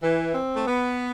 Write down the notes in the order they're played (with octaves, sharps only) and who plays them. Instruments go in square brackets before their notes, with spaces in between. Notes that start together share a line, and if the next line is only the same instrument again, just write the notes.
[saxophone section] E3
C4
A3
B3